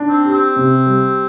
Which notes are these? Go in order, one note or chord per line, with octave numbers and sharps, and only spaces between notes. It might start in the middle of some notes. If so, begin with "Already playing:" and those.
Already playing: D4
C4
G4
C4
C3
G3